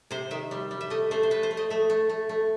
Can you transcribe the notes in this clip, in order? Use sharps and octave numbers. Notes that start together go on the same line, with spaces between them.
C3 C5
D#3 E5
G3
G3
E5
A3 D#5
A3 C5
C5
A3 B4
C5
A3
D#5
A3 E5
A3
A3
A3